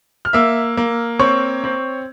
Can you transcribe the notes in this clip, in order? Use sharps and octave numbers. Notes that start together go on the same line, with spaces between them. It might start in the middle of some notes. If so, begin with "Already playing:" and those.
F6
A#3 E5 E6
A#3
C4 C#5 C#6
C4